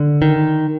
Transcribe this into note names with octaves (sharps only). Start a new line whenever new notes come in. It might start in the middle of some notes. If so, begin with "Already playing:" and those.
Already playing: D3
D#3